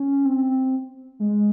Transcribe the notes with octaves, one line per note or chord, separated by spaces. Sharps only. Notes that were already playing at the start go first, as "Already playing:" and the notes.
Already playing: C#4
C4
G#3